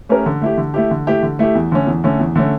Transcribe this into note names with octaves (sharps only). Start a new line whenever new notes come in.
A3 C#4 G4 A#4
D3
A3 E4 G4
D3
A3 E4 G4
D3
A3 E4 G4
D3
A3 E4 G4
E2
D3 A3 C#4
E2
D3 A3 C#4
E2
D3 A3 C#4